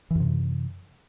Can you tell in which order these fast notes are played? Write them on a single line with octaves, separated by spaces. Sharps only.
E3 F#2 C3